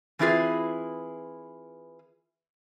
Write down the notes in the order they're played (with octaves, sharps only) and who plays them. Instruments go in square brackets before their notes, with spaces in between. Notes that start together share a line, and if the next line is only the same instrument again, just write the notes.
[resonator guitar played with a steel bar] E3 C4 E4 F4 G#4 B4